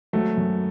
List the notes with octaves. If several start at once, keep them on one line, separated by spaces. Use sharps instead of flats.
G#1 F#3 A3
F#2